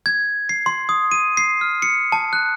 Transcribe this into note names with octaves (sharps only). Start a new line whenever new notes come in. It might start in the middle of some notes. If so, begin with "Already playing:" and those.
G#6
C7
C6
D#6
D#7
C7
F6
C#7
A5
F#6